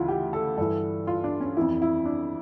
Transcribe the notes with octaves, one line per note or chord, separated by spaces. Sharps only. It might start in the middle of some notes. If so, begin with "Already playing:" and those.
Already playing: D2 C#3 E3 E4 F4
G4
A4
G2 E3 A4
F4
D4
C#4
F2 E3 E4
E4
D4